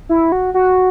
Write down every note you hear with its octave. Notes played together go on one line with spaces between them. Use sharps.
E4
F#4
F#4